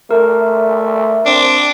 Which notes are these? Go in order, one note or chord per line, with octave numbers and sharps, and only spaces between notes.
A3 A#4
C4 D4